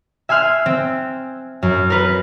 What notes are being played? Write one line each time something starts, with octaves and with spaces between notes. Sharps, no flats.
E5 G#5 C6 F6 F#6
C4
F#2
A#4 B4